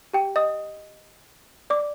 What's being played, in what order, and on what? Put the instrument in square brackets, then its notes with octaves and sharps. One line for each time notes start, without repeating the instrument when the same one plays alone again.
[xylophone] G4 G5
D#5 D#6
D5 D6